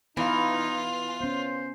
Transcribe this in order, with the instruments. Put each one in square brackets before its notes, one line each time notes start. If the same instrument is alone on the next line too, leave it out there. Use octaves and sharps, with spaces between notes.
[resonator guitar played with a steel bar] E3 [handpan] B3 F5 [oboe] D#4 [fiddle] F4
[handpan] B3 C#4 [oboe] C5